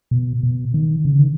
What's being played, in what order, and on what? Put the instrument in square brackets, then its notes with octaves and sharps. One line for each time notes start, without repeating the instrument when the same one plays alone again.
[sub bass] B2
B2
D#3
C#3
D#3